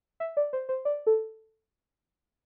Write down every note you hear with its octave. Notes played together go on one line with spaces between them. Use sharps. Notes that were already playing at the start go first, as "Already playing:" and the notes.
E5
D5
C5
C5
D5
A4